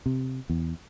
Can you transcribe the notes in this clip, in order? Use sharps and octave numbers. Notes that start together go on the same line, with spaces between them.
C3
E2